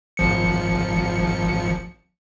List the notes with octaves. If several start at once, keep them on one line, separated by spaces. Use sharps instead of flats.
G#1 F3 C#7